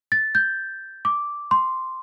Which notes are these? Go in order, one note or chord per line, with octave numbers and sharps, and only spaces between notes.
A6
G6
D6
C6